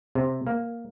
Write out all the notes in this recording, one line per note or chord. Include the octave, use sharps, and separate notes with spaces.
C3
A#3